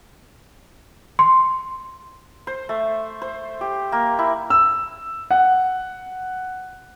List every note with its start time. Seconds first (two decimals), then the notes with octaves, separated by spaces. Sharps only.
1.19 C6
2.47 C5
2.69 A3
3.22 C5
3.61 G4
3.92 A#3
4.19 E4
4.50 E6
5.31 F#5